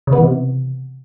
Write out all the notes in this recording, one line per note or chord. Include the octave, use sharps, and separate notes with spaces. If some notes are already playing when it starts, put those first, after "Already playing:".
C#3
B3
E3
C3